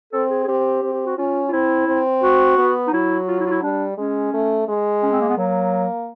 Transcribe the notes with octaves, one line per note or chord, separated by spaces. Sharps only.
C4 A4
G#4
G#4
C4 G4
C4
G4
F#4
C#4 F4
F4
C4 E4
C4
F#4
B3
D#4
F#3 E4
F4
E4
F4
E4
G3 D4
G#3 C#4
A3
G#3
C#4
C4
A#3
B3
F#3 A#3